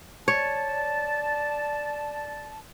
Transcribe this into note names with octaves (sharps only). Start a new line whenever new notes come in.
C#5 D5 A5